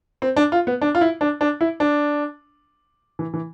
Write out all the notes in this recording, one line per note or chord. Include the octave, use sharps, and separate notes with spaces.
C4
D4
F4
B3
D4
F4
E4
D4
D4
E4
D4
E3
E3